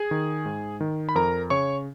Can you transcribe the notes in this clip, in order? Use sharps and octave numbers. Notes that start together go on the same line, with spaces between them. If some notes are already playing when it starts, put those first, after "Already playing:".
Already playing: G#4 G#5
D#3
G#2
D#3
B5
F2 A#4 A#5
C#3 C#5 C#6